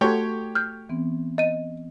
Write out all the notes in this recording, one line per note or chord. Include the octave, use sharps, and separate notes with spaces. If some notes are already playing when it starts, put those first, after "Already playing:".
A3 F#4 G4 C#5 A5 C6 G#6
F6 G6
E3 B3 C4
D#5 D#7